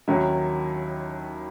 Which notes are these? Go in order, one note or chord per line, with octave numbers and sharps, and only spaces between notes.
D#2 D#3 F#3 C#4 E4